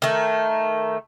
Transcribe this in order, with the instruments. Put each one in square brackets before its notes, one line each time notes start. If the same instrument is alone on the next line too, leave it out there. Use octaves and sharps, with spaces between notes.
[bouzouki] D#3 A3